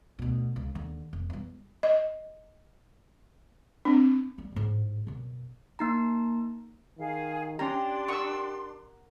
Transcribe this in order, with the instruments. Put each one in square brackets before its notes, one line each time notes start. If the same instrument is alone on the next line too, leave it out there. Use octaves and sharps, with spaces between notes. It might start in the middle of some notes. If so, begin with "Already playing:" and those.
[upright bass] D2 B2
C#2
D#2 D3
F1
E2 G3
[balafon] D#5
C4 D4
[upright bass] G3 B3
A1 G#2
F#2 B2
[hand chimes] A#3 D#4 A#5
[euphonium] D#3 [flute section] G#4 F5
[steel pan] C#4 A#5 [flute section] D4 C6 [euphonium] G4 [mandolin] G5 G#5
[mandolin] A#4 F#5 D#6 [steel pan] C#6 E6